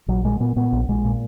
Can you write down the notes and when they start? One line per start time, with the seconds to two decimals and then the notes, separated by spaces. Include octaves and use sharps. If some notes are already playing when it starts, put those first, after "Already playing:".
0.08 A#1 F#3
0.24 A#2 G#3
0.40 A#2 B3
0.56 A#2 B3
0.72 A#1
0.88 A#1 G#3
1.05 A#2